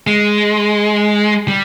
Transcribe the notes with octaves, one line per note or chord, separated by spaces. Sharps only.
G#3
G3